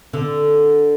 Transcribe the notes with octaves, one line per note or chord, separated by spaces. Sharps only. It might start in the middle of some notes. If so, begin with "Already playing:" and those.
D3